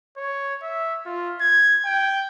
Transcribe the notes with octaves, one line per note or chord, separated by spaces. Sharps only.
C#5
E5
F4
G#6
G5